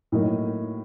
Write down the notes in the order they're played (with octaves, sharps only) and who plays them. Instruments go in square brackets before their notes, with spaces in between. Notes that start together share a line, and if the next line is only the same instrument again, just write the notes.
[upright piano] A2 F#3 A#3 D#4